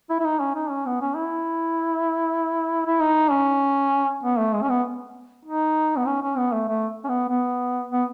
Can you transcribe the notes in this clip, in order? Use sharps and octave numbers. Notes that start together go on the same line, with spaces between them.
E4
E4
D#4
C#4
D#4
C#4
B3
C#4
E4
E4
D#4
C#4
B3
A3
G#3
C#4
B3
D#4
B3
C#4
C#4
B3
A3
A3
C#4
B3
B3
B3